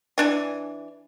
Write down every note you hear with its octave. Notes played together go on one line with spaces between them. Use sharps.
E3 D4 G#5